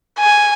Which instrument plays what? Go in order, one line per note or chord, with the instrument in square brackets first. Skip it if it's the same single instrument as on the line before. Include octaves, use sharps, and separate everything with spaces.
[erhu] G#5